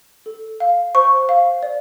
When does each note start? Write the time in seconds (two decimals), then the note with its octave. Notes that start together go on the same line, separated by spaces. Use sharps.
0.26 A4
0.60 F5
0.95 C5 C#6
1.29 F5
1.63 D5